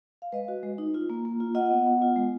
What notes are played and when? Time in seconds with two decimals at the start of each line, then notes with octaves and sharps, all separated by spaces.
0.22 F5
0.32 G#3 B4 D#5
0.48 F#4
0.63 G#3
0.78 D#4
0.94 F4
1.10 A#3
1.25 A#3
1.40 F4
1.55 F4 D#5 F#5
1.71 B3
1.86 B3
2.02 F4
2.16 G#3